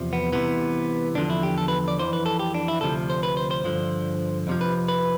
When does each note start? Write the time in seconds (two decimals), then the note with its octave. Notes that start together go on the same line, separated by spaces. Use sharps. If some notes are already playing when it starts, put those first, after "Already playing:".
Already playing: E2 C3 F3
0.13 B3
0.33 C2 C3 E3 B3
1.15 E2 D3 F3 D4
1.30 E4
1.43 G4
1.58 A4
1.68 B4
1.88 D5
1.99 F2 E3 C5
2.13 B4
2.26 A4
2.39 G4
2.54 D4
2.68 E4
2.81 D2 C3 F3 A4
3.10 C5
3.23 B4
3.37 C5
3.51 C5
3.64 G2 D3 F3
4.47 F2 C3 F3
4.61 B4
4.88 B4